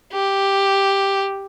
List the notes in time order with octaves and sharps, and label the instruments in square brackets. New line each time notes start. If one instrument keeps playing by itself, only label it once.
[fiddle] G4